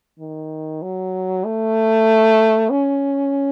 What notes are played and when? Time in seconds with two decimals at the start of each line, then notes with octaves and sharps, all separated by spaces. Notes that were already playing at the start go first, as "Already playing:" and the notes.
0.19 D#3
0.82 F#3
1.45 A3
2.70 C#4